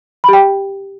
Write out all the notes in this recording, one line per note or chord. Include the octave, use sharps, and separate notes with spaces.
G4 G5 B5